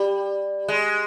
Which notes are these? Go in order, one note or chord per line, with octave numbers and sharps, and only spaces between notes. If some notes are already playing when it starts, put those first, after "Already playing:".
Already playing: G3
G#3